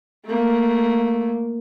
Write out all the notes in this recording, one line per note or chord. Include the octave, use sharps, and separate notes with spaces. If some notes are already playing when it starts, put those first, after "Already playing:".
A3 A#3